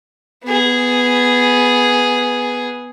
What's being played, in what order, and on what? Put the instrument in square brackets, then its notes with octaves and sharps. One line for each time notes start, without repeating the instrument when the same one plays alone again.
[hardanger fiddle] B3 G#4